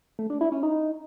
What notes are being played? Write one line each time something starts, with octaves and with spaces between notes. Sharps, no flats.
A3
D4
E4
C#4
D#4